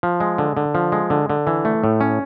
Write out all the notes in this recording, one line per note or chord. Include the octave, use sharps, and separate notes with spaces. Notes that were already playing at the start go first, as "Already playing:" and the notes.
F3
G#3
D3
D3
F3
G#3
D3
D3
E3
A3
A2
C#4